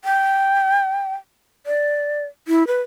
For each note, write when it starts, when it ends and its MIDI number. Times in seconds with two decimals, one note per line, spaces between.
0.04 1.14 79
1.66 2.24 74
2.48 2.66 64
2.67 2.81 71